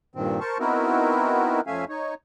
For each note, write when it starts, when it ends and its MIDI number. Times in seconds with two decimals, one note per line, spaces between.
0.16 0.40 43
0.16 0.40 46
0.16 0.40 51
0.16 0.40 60
0.40 0.58 70
0.40 0.58 72
0.40 0.58 81
0.40 0.58 85
0.59 1.61 59
0.59 1.61 60
0.59 1.61 63
0.59 1.61 64
0.59 1.61 66
0.59 1.61 70
1.67 1.85 41
1.67 1.85 57
1.67 1.85 61
1.67 1.85 76
1.67 1.85 77
1.67 1.85 80
1.89 2.14 63
1.89 2.14 73